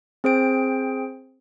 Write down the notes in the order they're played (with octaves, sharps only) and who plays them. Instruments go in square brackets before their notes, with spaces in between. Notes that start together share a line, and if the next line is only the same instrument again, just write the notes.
[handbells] C4 G#4 C5 G5 D7